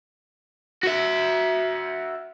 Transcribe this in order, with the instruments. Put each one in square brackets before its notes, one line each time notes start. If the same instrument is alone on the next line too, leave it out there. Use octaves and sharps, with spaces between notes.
[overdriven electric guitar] F#4 E5